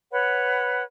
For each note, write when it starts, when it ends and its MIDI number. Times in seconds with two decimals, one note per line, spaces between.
0.12 0.83 71
0.12 0.83 73
0.12 0.83 78
0.12 0.83 83